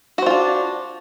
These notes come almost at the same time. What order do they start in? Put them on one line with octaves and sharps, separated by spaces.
F#4 C5 F4 D4